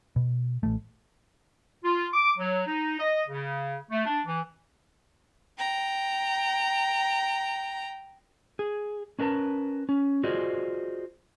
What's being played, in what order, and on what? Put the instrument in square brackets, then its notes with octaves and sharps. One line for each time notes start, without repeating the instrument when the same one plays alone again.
[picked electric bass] B2
A1 A3
[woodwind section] F4
D6
F#3
D#4
D#5
C#3
A3
D4
E3
[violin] G5 A#5
[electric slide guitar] G#4
C#4 D4 A#4 B4 A5
C#4
F4 F#4 G#4 C5 D5 D#5